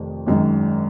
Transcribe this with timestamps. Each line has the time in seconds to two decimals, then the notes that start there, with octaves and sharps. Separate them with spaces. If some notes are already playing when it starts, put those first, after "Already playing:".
Already playing: F1 F2 D#3
0.26 G#1 F#2 D#3 G#3